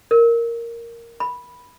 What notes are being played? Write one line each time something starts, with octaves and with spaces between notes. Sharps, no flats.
A#4
B5